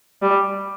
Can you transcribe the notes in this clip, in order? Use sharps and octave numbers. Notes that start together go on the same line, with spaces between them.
G3